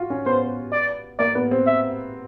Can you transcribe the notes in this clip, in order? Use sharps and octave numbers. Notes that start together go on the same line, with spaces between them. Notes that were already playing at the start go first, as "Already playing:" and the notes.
Already playing: F4 F#4
C#4
B3 C5
D5
A#3 D5
B3
C4
E5